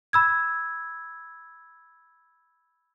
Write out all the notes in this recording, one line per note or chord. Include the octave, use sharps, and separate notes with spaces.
B5 E6 G#6